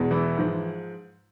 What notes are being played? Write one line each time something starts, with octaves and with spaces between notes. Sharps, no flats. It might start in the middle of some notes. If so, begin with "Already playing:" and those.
Already playing: E2 B2 G#3
E3 E4
G#2 F3 G#3